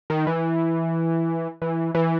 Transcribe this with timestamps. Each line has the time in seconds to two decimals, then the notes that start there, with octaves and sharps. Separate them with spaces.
0.10 D#3
0.27 E3
1.62 E3
1.95 E3